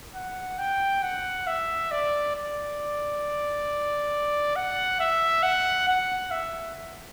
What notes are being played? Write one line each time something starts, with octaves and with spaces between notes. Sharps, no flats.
F#5
G5
F#5
E5
D5
D5
F#5
E5
F#5
F#5
E5